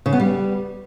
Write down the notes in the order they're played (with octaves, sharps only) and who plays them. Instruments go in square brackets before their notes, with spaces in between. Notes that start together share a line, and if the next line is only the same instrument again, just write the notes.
[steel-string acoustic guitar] C#3
B3
G3